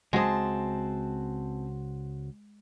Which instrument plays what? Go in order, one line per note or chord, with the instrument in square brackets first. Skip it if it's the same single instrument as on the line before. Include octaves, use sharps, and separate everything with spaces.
[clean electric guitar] C#2 F#4 C5 [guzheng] G#3 G#4 [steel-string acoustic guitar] C4 A5